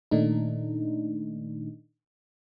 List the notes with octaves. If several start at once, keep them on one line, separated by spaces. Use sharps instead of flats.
A#2 D#3 A3 D4 D#4